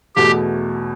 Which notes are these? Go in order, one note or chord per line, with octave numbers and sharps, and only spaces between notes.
E2 B2 A3 G4